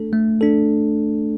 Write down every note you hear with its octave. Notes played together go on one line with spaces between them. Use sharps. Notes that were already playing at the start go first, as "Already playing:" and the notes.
Already playing: A3 D4 A4
A3
D4 A4